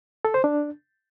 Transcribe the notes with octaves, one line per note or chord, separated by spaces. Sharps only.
A4
C5
D4